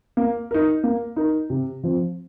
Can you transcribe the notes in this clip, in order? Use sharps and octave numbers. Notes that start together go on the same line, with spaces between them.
A#3
D#4 A#4
A#3
D#4 A#4
C3
F3 C4